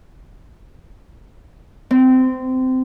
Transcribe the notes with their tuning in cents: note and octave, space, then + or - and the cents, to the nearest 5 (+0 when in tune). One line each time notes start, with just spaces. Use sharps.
C4 -20